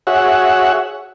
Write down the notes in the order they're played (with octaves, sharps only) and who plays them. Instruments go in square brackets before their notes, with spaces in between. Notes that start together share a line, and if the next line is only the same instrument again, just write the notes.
[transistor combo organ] F#4 G#4 C#5 E5 F#5